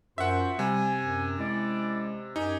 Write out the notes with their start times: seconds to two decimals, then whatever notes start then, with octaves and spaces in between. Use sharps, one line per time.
0.18 F#2 F4 F#4 C5 E5 F#5
0.59 C3 G3 G#5
1.00 F#2
1.39 G#3 C#4 E4 D5
2.36 F#2 D#4 G4 G#5